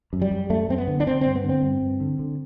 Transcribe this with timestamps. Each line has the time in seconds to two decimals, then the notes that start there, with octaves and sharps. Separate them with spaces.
0.13 F#2
0.22 G3
0.31 F#2
0.50 F#2 A3
0.69 F#2 C4
0.78 B3
0.88 D3
1.00 D4
1.07 D3 C4
1.21 G2 C4
1.35 B3
1.44 D3
1.49 C4
1.63 G2
1.82 G2
2.00 D3
2.19 D3